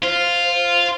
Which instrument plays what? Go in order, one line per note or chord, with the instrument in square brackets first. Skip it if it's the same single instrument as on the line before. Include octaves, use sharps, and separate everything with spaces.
[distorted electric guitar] F4 [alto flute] C5